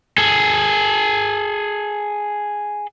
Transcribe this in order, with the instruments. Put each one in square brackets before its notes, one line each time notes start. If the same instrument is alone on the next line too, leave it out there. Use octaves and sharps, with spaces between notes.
[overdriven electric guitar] G#4 A4